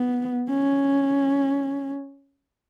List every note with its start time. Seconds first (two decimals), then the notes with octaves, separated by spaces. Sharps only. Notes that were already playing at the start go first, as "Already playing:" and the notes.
Already playing: B3
0.49 C#4